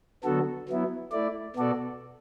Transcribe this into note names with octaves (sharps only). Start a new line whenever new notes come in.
D3 F#3 B3 F#4 A4
F#3 B3 E4
A3 E4 D5
B2 B3 F#4 A4 D5